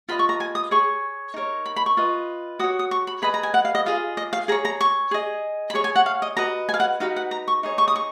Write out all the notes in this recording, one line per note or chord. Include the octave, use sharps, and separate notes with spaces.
F4 B4 D#5 B5
C#6
A#5
G#5
D#6
G#4 C#5 C#6
D#4 A#4 C#5
B5
B5
C#6
F4 B4 D#5
F#4 C#5 D#6
D#6
C#6
B5
G#4 B4 D#5 B5
A#5
G#5
F#5
F5
D#5
F4 G#4 D#5 F5
D#5
F5
G#4 C#5 A#5
A#5
C#6
G#4 D#5
B5
G#4 C#5 C#6
G#5
F#5
F5
D#5
F#4 B4 D#5 A#5
G#5
F5
F#5
D#4 F#4 B4 F5
F#5
A#5
C#6
D#4 G#4 C#5
C#6
D#6
C#6